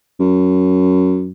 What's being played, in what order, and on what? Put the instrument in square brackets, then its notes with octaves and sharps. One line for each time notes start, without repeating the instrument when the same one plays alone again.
[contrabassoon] F#2